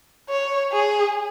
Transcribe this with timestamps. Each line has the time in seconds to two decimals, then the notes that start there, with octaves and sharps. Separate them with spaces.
0.30 C#5
0.72 G#4